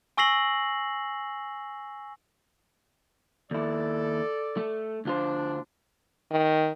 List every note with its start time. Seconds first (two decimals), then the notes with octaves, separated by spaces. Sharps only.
0.17 G#5 C#6 E6 A#6 C7 F#7
3.51 D#2 E4 A4 D5
4.57 A3
5.05 D2 D4 F4 C5
6.32 D#3